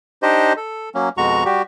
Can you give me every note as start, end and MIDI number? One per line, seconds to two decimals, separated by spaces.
0.23 0.53 62
0.23 0.53 63
0.23 0.53 67
0.23 0.53 72
0.23 0.53 75
0.57 0.89 69
0.95 1.09 54
0.95 1.09 58
0.95 1.09 61
1.17 1.44 41
1.17 1.44 47
1.17 1.44 56
1.17 1.44 66
1.17 1.44 82
1.17 1.44 85
1.45 1.62 55
1.45 1.62 66
1.45 1.62 67